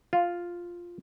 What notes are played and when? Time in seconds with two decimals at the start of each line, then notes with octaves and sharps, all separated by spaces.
0.13 F4